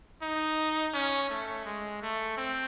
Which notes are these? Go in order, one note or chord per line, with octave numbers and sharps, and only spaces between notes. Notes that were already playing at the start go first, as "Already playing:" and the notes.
D#4
C#4
A3
G#3
A3
C4